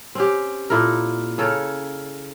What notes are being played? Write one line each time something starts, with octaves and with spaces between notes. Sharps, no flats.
C4 C#4 G4
A#2 E4 A4 A#4
C#3 A4 A#4 C#5